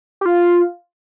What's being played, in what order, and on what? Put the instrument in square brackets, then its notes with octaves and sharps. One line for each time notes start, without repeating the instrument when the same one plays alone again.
[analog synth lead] G4
F4